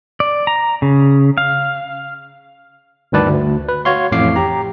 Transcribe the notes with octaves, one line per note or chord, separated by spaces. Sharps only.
D5
A#5
C#3
F5
D2 G2 D#3 B4 D5 A5
D2
B4
F#4 C#5 F5 C6
A1 F2 A2 F5 D6 C7
G4 A#5